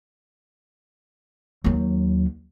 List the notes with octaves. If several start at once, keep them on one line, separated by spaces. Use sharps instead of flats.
D#2 F#3